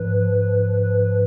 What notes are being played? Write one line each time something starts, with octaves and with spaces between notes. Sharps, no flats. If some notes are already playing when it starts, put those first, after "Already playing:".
Already playing: G#2 F3 B4
B4